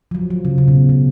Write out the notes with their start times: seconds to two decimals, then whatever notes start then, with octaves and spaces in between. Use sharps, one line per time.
0.11 F3
0.15 F#3
0.30 F3
0.45 C#3
0.58 C#3
0.68 B2
0.89 B2